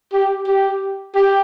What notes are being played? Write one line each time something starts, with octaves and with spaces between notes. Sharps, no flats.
G4
G4
G4